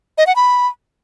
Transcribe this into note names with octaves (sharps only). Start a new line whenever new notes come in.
D#5
F#5
B5